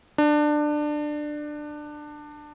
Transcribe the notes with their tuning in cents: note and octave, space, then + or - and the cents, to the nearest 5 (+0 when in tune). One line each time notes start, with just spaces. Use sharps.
D4 +20